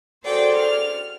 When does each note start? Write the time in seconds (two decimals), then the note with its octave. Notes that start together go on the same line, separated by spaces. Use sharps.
0.23 F#4 G#4 A4 C5 D5 G5
0.56 F6